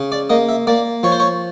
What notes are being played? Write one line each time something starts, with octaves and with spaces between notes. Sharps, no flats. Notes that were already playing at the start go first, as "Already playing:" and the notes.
Already playing: C#3
D5
A#3 D#5
E5
A#3 D5
F3 C#5
C5
C#5